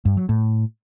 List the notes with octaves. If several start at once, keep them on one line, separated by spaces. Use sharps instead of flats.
G2
F#3
A2